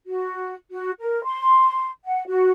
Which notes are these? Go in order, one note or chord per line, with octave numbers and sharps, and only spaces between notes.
F#4
F#4
A#4
C6
F#5
F#4